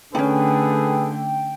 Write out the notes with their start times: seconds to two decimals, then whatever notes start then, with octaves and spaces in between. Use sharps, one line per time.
0.15 D3 A3 C#4 D#4 G#4 A4 B4 G5